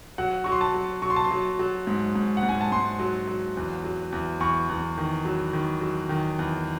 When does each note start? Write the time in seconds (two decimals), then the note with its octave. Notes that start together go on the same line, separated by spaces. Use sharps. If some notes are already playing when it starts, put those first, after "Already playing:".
0.18 F#3 F#5
0.44 F#3 C#6
0.52 C6
0.61 A5
0.74 F#3
1.02 F#3 C#6
1.10 C6
1.16 A5
1.24 C6
1.31 F#3
1.59 F#3
1.87 G#2
2.15 G#2
2.37 F#5
2.43 G#2
2.49 G#5
2.61 A5
2.72 G#2 C6
3.00 F#3
3.28 F#3
3.57 E2
3.84 F#3
4.12 E2
4.40 E2 C#6
4.69 E2
4.98 D#3
5.25 F#3
5.53 D#3
5.81 F#3
6.09 D#3
6.39 E2